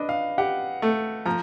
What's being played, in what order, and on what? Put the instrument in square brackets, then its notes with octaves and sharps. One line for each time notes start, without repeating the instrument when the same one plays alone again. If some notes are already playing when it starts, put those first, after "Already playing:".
Already playing: [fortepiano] D4 [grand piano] B4 D#5
[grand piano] F5
[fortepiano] G4 [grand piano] F#5
[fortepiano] A3
[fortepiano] F3 [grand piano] A#5